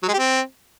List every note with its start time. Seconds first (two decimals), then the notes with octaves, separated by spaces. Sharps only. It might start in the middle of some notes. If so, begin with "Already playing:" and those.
0.03 F#3
0.08 G#3
0.13 G4
0.19 C4